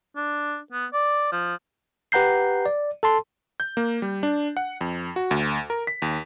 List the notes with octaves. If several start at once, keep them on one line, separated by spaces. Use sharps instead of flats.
D4
B3
D5
F3
G4 B4 F#5 A#5 G6 C7
D5
A4 A5 C6
G6
A#3
G3
D4
F#5
F2
F#4
D2
A#4
B6
D#2